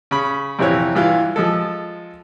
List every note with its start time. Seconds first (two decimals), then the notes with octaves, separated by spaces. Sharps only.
0.11 C#3 B5
0.59 F2 C3 E3 C4 C#5
0.95 G2 E3 F4
1.36 F3 G#3 A4